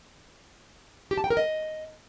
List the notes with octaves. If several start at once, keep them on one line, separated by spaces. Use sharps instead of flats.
G4
A5
G5
A#4
D#5